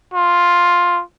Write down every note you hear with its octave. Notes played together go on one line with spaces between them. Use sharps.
F4